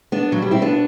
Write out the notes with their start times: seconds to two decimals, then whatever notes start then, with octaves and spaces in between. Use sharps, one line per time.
0.12 B3 D4
0.32 B2 F#3
0.42 G3
0.51 C4 E4
0.62 B3 D4